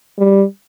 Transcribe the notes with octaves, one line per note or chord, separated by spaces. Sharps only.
G3